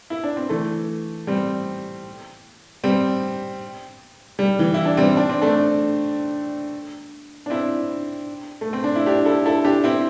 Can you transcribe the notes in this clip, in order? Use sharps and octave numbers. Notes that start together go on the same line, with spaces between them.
E4
D4
C4
E3 A3
G3 C4
G3 C4
G3
E3
E4
D4
G3 C4
D4
C4
A3 D4
D4
C4 E4
A3
C4
D4
E4
D4 G4
E4 A4
E4 A4
D4 G4
C4 E4